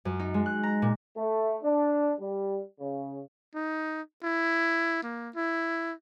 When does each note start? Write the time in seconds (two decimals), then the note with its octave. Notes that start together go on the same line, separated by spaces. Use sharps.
0.05 F#2
0.19 D#4
0.34 G#3
0.46 F#6
0.63 A#5
0.82 A#2
1.15 A3
1.63 D4
2.18 G3
2.79 C#3
3.55 D#4
4.23 E4
5.03 A#3
5.35 E4